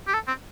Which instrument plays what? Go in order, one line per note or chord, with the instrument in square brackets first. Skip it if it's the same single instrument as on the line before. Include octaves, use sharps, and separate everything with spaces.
[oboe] G4
A4
C4